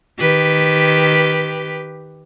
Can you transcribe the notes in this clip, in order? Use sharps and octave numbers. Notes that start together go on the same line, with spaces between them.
D#3 G4 B4